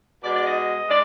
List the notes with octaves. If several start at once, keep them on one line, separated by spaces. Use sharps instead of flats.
B2 G#3 D5
D5
D#5
G#3 D5